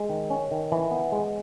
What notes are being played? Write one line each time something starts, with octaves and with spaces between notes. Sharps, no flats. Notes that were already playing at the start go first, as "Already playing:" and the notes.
Already playing: G#3
D#3
C#4
D#3
E3
B3
G#3